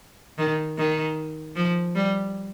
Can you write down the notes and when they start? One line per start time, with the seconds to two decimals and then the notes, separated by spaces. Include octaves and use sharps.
0.38 D#3
0.78 D#3
1.56 F3
1.95 G3